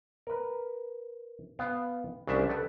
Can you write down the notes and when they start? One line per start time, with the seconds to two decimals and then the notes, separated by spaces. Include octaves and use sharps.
0.27 A#4 B4
1.59 B3 F5 G5
2.27 C2 C#3 D4 E5
2.49 A4 B4 G5